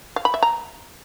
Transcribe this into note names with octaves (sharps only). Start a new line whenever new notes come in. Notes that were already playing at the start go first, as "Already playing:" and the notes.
F5
B5
E5
A#5